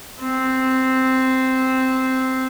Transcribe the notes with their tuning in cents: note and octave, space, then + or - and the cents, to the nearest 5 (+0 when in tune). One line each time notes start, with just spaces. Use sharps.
C4 -5